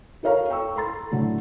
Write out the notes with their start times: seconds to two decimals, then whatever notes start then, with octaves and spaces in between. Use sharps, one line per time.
0.23 F#4 A4 A#4 C#5 F5 A#5
0.50 G5 C#6 E6
0.76 A4 A#5 C6 A6
1.12 A2 D3 F#3 A3